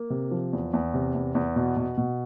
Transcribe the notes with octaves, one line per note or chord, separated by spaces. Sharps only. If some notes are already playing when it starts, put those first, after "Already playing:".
Already playing: A#3
C3
F3
E2
E2
C3
E2
E2
B2
B2
B2